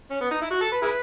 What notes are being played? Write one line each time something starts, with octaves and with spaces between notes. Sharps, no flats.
C#4
B3
D#4
E4
F#4
A4
B4
E4 G#4 B4